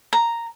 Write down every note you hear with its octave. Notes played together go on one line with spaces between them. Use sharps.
A#5